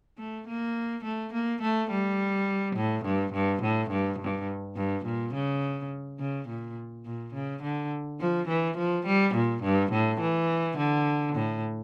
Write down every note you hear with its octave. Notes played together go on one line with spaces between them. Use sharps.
A3
A#3
A3
A#3
A3
G3
A2
G2
G2
A2
G2
G2
G2
A#2
C#3
C#3
A#2
A#2
C#3
D3
F3
E3
F3
G3
A#2
G2
A2
E3
D3
A2